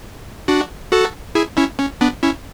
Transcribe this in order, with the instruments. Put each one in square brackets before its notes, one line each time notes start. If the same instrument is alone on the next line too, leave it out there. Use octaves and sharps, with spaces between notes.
[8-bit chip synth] D4 F#4
F#4 A4
E4 G#4
C#4 E4
C#4
B3 D4
C#4 E4